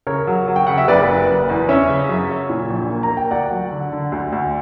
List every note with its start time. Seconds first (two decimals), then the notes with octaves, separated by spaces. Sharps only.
0.07 C#3 A#4 C#5
0.27 F#3
0.48 F#3
0.56 G5
0.67 C#3 F#5
0.77 E5
0.88 F#1 B4 D5
1.08 F#1
1.28 F#1
1.49 E2
1.69 C#4 C#5 E5
1.89 C#3
2.09 F#2
2.29 F#2
2.50 A#2
2.70 A#1
2.91 A#3
3.03 A#5
3.10 A#3
3.17 G5
3.31 D2 D5 F#5
3.51 F#3
3.71 D3
3.92 D3
4.12 D2
4.32 D2